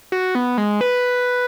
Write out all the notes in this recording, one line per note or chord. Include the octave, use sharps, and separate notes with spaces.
F#4
B3
G#3
B4